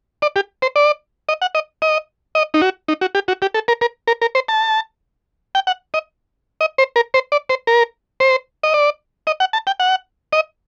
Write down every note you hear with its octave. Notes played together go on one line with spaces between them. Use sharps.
D5
G4
C5
D5
D#5
F#5
D#5
D#5
D#5
D#4
F#4
D#4
F#4
G4
F#4
G4
A4
A#4
A#4
A#4
A#4
C5
A5
G5
F#5
D#5
D#5
C5
A#4
C5
D5
C5
A#4
C5
D#5
D5
D#5
F#5
A5
G5
F#5
D#5